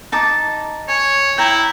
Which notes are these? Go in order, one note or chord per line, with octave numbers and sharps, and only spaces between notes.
D#4 A5 D6
C#5 G#5
E4 G5 A#5